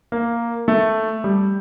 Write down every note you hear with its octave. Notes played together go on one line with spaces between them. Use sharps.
A#3
A3
G3